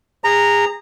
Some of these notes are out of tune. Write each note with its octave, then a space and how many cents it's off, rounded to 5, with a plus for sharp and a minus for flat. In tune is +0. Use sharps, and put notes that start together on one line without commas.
G#4 -30 A#5 -10